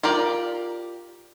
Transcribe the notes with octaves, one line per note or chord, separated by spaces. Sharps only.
F4 G4 A#4 D5